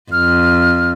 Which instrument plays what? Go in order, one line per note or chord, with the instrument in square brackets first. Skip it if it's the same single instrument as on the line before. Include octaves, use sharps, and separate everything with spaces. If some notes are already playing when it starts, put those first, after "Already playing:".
[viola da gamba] F2 [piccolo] F6